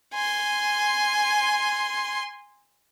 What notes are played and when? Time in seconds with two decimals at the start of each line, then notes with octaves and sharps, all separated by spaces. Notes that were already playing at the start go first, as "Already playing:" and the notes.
0.14 G#5 C6